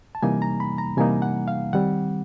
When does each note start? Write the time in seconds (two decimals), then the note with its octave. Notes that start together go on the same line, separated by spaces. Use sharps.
0.15 A5
0.22 C3 E3 G3 A#3 D#4 G#5
0.42 A#5
0.60 B5
0.78 A#5
0.97 C3 E3 G3 A#3 D#4 G#5
1.22 F#5
1.48 F5
1.73 D#3 G3 C4 F#5